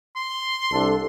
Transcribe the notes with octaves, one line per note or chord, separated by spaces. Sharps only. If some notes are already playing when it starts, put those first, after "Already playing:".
C6
C2 D4 A4